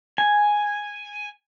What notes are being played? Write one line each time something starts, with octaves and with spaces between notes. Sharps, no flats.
G#5